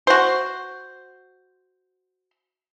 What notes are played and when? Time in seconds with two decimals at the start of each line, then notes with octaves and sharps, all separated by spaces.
0.07 F#4 C5